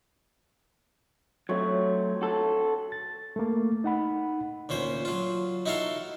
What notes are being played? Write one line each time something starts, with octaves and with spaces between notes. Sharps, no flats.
F#3 A3 C4 C#5
F#4 A4
A6
A3 A#3
D#4 F#5 B5
D2 A#2 C#4 C5
F#3 F4
D#4 E4 F#4 A4 F5 C6